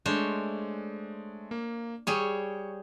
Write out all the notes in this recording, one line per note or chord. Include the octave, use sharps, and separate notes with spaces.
G#3 A3 D4 C5 C#5
A#3
G3 G#4 C#5 C#6